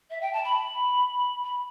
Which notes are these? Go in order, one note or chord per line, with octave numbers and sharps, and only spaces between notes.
E5
G5
A5
B5
B5